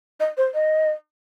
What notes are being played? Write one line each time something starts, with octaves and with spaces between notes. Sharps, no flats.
D#5
C5
D#5